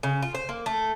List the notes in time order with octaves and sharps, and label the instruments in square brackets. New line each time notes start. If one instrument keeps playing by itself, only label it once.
[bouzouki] C#3
F4
C5
A#3
A3